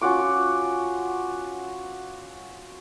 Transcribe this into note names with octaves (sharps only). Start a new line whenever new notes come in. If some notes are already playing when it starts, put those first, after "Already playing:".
C#4 F4 F#4 D6